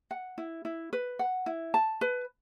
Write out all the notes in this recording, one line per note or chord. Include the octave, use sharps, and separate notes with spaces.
F#5
E4
E4
B4
F#5
E4
A5
B4